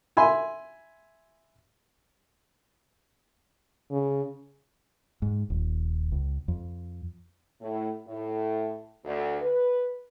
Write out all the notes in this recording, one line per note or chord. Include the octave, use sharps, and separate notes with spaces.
E5 G#5 B5 C6
C#3
G#2
D#1
C#2
F2
A2
A2
D2
B4